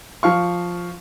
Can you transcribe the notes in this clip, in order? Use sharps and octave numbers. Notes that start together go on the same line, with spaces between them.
F3 F5 C#6